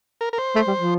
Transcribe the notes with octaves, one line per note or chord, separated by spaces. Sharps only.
A#4
A#4
C5
A3
G3
F3